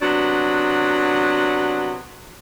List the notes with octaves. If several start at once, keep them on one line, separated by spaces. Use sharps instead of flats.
C3 F#3 B3 D4